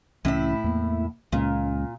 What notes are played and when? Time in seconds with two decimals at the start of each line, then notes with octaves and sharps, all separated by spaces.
0.25 C2 A2 E3 C#4 E4
0.64 E2 A#3
1.32 C#2 A#2 G#3 C#4